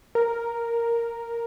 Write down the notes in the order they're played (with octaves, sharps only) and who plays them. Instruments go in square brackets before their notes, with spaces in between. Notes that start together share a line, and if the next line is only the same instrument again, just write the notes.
[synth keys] A#4